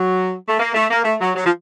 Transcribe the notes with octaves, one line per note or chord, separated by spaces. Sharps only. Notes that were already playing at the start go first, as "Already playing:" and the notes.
Already playing: F#3
A3
A#3
A3
A#3
A3
F#3
F#3
F3